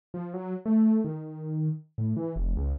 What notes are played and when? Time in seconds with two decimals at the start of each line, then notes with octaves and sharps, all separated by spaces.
0.14 F3
0.34 F#3
0.66 A3
1.04 D#3
1.98 A2
2.17 E3
2.36 F1
2.56 C#2